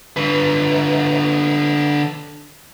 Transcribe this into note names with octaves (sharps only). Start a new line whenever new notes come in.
D3 B4